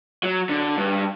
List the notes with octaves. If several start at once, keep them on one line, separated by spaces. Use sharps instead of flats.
F#3
D3
G2